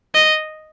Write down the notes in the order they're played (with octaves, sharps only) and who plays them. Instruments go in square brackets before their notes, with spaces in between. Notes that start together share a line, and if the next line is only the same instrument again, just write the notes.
[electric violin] D#5